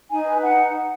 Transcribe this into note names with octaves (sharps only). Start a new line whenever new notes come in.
D#4 G#5
B4
D#4 F#5